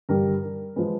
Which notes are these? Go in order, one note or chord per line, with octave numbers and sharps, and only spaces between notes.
G2 D3 G3 A#4
A#4
F3 G#3 B4